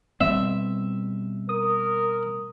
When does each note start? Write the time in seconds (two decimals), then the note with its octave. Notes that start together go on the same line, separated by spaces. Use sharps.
0.21 B2 G3 C4 E5
1.49 A#4 D#6